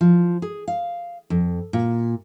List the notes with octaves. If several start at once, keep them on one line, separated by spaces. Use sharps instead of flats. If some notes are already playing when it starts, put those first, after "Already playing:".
F3
G#4
F5
F2
A#2